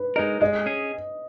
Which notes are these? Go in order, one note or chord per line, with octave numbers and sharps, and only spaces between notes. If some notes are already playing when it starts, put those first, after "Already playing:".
Already playing: B4
G#3 D#4 A#4 D#5
G#3 D#5
C#4 G#4